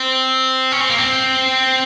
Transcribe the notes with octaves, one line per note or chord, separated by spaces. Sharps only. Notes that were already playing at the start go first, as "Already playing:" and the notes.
Already playing: C4
C#4
C4
A#3
C4